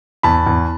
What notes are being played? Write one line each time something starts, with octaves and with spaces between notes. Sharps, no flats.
E2 A5 B5
E2